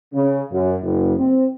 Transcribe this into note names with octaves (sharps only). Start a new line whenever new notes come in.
C#3
F#2
F#1
C4